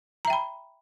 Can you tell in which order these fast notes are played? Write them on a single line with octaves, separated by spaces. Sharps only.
A#5 E5 G5 B5